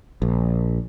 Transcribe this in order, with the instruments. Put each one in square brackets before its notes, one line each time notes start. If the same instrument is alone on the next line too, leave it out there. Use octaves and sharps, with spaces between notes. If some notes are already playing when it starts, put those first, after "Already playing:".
[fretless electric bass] A#1